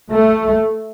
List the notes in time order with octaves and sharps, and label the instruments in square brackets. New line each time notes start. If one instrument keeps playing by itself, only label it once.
[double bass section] A3